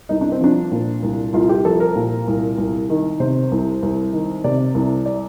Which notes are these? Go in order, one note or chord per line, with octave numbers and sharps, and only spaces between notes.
C2 D#4
D4
C4
F3 D4
A#2
C2
C2 F4
G4
F3 A4
A#4
A#2
C2
C2
D#3
C3 C5
C2
C2
D#3
C3 D5
C2
D5